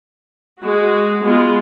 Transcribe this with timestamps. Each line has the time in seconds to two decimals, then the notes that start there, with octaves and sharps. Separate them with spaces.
0.61 G#3 F#4
1.23 G#3 B3 F4